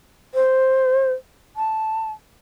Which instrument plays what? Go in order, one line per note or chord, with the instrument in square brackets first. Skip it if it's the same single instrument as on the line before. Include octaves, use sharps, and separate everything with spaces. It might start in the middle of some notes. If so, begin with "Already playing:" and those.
[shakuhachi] C5
A5